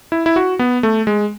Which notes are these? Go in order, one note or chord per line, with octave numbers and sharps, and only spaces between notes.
E4
E4
F#4
B3
A3
G#3